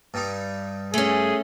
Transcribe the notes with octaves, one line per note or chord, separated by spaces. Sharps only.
G2 G3 D#4
A3 C#4 G#4